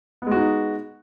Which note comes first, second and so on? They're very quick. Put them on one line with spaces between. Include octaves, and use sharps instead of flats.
B3 G#3 F#4 D#4